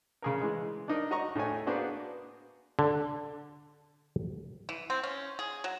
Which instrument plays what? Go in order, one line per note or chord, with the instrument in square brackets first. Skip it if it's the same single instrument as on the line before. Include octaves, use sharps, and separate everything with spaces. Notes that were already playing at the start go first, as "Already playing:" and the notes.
[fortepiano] C#3 G#4 A#4
E3 G#3
D4 D#4 A#4
F#4 D#5 A#5 C#6
A2 A3 C#5 G#5
A#3 B3 D4 F#4 G#4 C5
[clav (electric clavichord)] D3
[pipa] E3
C4
C#4
G#4
F#3